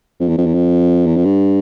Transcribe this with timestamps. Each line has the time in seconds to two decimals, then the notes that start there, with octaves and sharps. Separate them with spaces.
0.20 F2
0.29 E2
0.38 F2
0.46 E2
0.54 F2
1.06 E2
1.16 F2
1.25 G2